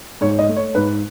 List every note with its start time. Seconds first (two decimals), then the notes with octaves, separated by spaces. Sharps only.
0.21 G#2 C#5
0.39 D#5
0.48 A3
0.56 C#5
0.75 G#2 B4